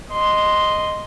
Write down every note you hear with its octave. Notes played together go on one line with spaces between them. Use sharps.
D#5 C6